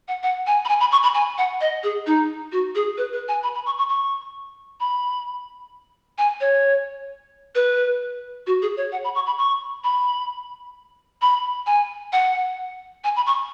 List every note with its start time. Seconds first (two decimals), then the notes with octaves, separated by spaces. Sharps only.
0.08 F#5
0.23 F#5
0.47 G#5
0.65 B5
0.69 G#5
0.80 B5
0.92 C#6
1.03 B5
1.14 G#5
1.38 F#5
1.61 D#5
1.83 G#4
2.06 D#4
2.52 F#4
2.75 G#4
2.98 B4
3.13 B4
3.28 G#5
3.43 B5
3.55 B5
3.66 C#6
3.78 C#6
3.89 C#6
4.80 B5
6.18 G#5
6.41 C#5
7.55 B4
8.47 F#4
8.62 G#4
8.77 C#5
8.92 F#5
9.04 B5
9.15 C#6
9.26 B5
9.38 C#6
9.84 B5
11.22 B5
11.66 G#5
12.13 F#5
13.04 G#5
13.16 B5
13.27 C#6